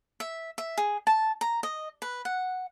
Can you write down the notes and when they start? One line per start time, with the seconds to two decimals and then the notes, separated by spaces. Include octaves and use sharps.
0.20 E5
0.58 E5
0.78 G#4
1.07 A5
1.41 A#5
1.63 D#5
2.02 B4
2.25 F#5